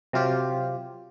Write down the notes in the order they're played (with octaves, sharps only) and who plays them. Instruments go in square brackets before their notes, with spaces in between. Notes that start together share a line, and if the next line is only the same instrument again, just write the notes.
[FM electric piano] C3 F#3 F4 G4